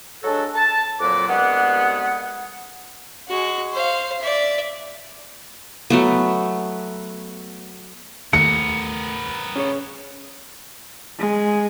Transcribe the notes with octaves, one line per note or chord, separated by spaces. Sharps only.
F#3 G#3 D4 F#4 A4
A5
F2 A#2 F#3 F#4 D6
C2 G2 G#3 B3 G#4 F#5
G#3 F#4
C5 F5
D5 E5
F#3 A3 B3
D#2 A3 B3 A#4 C#7
C#4 G#4 C#5
G#3